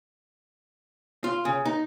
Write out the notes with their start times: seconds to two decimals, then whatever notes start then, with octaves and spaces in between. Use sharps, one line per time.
1.24 F4
1.45 C#3
1.65 D#4